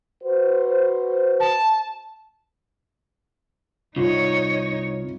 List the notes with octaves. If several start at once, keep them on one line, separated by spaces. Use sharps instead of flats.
F#4 B4 C5
A5
C2 D#4 F4 C#5